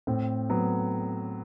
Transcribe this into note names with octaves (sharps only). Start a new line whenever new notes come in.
A2 C4
F#3 B3